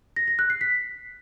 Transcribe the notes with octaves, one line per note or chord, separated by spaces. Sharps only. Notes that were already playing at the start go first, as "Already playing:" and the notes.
A#6
A#6
F#6
C7
B6